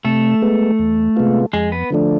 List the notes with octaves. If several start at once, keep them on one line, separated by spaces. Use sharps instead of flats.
C3 A3 A4
G#3 B3
E2
C3 G#3 B3 F4
F2 G#3 G#4
B3 B4
D3 F3 A3 D4